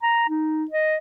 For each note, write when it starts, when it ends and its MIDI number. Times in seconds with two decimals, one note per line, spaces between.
0.03 0.28 82
0.29 0.65 63
0.71 0.97 75